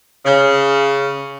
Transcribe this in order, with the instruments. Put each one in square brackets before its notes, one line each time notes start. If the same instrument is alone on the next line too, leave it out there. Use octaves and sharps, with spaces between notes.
[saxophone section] C#3